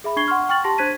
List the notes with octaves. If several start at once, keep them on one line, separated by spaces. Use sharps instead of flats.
G#4 E5 B5
D4 C#6 G#6 C7 G7
F#5 C6 C#6 F6
G5 C#6 F6 A6 F#7
G4 A5 C6 A#6
D4 C5 F#6 G#6 B6 D#7